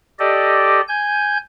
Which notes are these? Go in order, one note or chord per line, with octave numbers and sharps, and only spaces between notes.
G4 A4 D5 D#5
G#5 G6